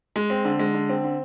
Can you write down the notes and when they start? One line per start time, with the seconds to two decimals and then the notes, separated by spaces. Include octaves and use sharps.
0.16 G#3
0.30 C4
0.45 D3
0.59 G#3
0.74 D3
0.89 C4
1.04 D3